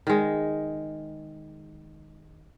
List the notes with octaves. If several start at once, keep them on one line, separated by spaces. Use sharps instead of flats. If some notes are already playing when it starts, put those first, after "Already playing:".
D#3 G#3